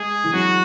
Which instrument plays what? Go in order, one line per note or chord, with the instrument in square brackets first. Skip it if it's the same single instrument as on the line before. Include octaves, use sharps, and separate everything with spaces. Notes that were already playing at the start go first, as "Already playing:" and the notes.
Already playing: [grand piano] G#3 [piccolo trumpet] G#4
[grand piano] E3
[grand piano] F#3 [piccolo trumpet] F#4